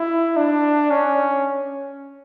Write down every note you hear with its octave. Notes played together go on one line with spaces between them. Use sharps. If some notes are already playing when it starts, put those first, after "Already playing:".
Already playing: E4
D4
C#4